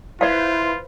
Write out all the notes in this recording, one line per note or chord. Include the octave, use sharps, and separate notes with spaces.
E4 F4 B4 C5 D5 F5